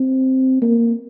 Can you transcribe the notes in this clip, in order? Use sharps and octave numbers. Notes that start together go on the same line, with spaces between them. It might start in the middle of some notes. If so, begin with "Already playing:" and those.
Already playing: C4
A#3